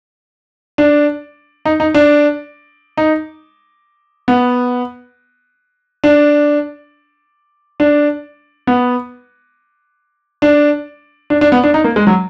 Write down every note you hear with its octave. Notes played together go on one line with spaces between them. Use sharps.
D4
D#4
D#4
D4
D#4
B3
D4
D4
B3
D4
D4
D4
B3
D4
D#4
A#3
G#3
F#3